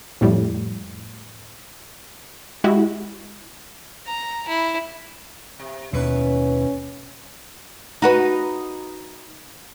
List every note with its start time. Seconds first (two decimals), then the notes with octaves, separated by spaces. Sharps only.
0.21 F2 A2 G3
2.64 G#3 E4 F#4 G4
4.06 A#5
4.48 E4
5.59 C3
5.93 D#2 B2 C#4 E4 B4
8.02 D#4 F#4 B4